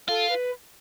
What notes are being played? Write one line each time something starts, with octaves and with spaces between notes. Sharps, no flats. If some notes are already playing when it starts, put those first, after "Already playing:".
F4 A4
B4